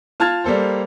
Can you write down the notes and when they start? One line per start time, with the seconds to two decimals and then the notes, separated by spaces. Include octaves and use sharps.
0.20 F4 A5 F6 G#6 A6
0.44 G3 A#3 A4 C5